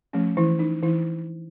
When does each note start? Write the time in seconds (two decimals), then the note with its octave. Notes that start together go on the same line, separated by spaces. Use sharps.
0.13 F3 A3 C#4
0.37 E3 E4
0.59 D#4
0.83 E3 E4